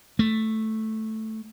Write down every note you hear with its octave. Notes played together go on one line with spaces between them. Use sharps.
A3